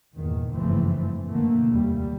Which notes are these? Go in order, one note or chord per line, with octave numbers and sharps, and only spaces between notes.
E2 G2 A#2 D#3
F#1 G2 E3 F3 A3 C4
B2 D3 A3 A#3
F1 D#2 G3